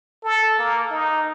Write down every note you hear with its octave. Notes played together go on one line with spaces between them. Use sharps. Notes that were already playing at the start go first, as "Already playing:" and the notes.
A4
A#3
D#4